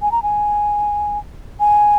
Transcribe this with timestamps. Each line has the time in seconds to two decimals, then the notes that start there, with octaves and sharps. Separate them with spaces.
0.02 G#5
0.12 A#5
0.23 G#5
1.60 G#5